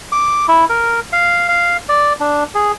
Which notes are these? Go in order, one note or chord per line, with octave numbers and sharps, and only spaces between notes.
D6
E4
A#4
F5
F5
D5
D4
G#4